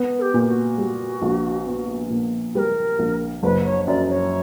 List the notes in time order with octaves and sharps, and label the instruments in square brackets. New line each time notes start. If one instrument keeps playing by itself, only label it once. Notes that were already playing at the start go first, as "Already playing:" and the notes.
Already playing: [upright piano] B3
[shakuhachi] A#4
G4
[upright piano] A#2
[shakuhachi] F#4
[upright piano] G3
A#1
B3
A#2
[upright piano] G3 [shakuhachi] B4
[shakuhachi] A#4
[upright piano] A#1
[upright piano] F#1 [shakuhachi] B4
[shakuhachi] C#5
[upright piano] F#2 [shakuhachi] D5
[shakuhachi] C#5